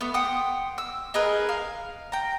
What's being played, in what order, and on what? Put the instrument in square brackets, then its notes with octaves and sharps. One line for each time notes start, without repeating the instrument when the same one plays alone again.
[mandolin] A3 B3
F#5 G5 C6 D#6
E6
D#4 G#4 A#4 B4
F5
G5 A#5